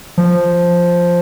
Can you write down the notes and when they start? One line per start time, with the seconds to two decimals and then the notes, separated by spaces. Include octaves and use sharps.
0.18 F3